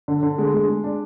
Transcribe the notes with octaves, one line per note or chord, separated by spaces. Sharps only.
D3
D3
G#3
G#3
G#3
D4